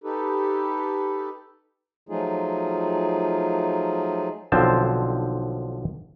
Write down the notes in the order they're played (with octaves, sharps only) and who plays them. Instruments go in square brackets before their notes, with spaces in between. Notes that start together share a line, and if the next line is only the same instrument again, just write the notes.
[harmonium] D#4 G4 A4 B4
F3 F#3 A3 D#4 F4 G#4
[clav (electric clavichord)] B1 D3 F3 C4 C5 A5